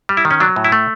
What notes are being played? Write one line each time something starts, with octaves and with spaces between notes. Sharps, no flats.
G3
E4
D#3
C#4
F#3 D4
A2
E4
A3